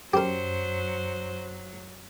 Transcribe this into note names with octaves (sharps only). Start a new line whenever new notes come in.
F#2 F#3 G4 A#4 C5